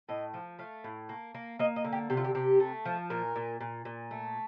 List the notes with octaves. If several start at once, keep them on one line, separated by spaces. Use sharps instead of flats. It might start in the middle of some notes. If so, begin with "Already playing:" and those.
A2 D#5
F3
A3 F5
A2
A#3
A#3
A#3 D#5
D#5
D3
G4
C3 G4
F4
G4
C3 G4
A3
F3
A#2 A#4
A#2
A#2
A#2
A3